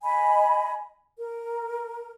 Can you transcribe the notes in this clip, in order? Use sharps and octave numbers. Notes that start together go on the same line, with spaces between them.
D#5 G#5 B5
A#4